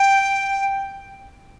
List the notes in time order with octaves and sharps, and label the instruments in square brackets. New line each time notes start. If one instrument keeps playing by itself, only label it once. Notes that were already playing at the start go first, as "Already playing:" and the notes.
Already playing: [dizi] G5